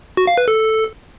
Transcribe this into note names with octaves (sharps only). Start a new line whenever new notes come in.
F#4
F5
B4
A4